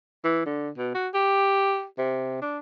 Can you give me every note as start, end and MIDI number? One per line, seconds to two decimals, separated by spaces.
0.24 0.42 52
0.45 0.69 50
0.77 0.90 47
0.94 1.08 66
1.14 1.85 67
1.98 2.38 48
2.42 2.58 62